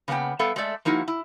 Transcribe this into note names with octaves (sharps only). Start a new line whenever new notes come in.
C#3 A#3 B3 F#5 G5
G3 B3 A4 E5 F5 G5
G#3 A3 A4 D5 E5
F3 A#3 D#4 E4 F#4
E4